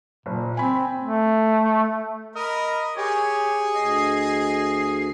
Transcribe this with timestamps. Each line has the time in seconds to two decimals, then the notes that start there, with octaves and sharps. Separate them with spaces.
0.26 F#1 A#2
0.57 C4 G#5 B5
1.01 A3
2.35 A#4 D#5 B5
2.97 G4 G#4 C#5
3.75 D2 D#5 C7